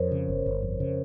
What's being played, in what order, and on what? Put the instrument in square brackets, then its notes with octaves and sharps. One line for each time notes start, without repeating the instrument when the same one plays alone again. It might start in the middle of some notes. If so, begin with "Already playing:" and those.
Already playing: [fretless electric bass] F2 [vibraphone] A#4 C5 C#5
[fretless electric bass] C#3
G1
G1
F2
C#3